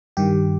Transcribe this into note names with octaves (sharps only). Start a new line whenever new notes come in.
G2 D#3 G4